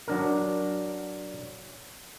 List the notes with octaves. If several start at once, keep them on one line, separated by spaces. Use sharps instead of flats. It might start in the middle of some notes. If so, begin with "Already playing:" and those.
F#3 D4 A#4